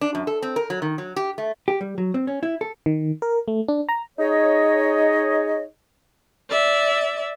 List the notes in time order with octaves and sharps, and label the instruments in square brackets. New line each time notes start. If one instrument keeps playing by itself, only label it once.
[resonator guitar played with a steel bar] D4
F#2
A4
C4
A#4
F#3
D#3
F#3
G4
A3
[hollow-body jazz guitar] G4
G3
F#3
C4
C#4
E4
A4
[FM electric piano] D#3
A#4
A3
D4
A#5
[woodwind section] D#4 G#4 C#5 D#5
[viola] D5 E5